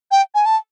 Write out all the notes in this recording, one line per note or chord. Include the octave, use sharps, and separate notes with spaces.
G5
G#5
A5